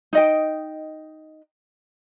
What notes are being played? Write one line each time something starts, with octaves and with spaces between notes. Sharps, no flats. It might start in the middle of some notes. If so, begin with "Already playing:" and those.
D#4 D#5 G5